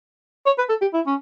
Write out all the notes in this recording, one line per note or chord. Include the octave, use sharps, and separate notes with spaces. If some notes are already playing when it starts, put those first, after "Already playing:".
C#5
B4
A4
G4
E4
C#4